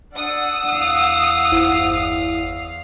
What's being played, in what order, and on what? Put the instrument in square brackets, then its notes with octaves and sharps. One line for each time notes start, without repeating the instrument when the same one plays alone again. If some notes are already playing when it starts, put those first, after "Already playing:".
[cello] D4 [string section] F#5 D#6 [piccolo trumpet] E6
[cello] E2 F5
[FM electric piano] G1 E4 C5